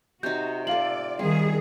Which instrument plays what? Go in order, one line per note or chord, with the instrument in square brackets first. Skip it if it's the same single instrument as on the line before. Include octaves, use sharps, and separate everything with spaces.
[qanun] C3 D#4 [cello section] F#4 [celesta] G6
[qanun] F4 A4 [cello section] D5 [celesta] F5 F#7
[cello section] D#3 G#4 [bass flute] G3 [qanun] C4